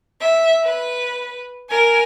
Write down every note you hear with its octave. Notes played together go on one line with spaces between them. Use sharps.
E5
B4
A#4 G#5